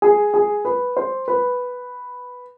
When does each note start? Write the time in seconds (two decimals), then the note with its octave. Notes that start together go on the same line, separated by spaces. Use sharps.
0.02 G#4
0.34 G#4
0.65 B4
0.97 C5
1.28 B4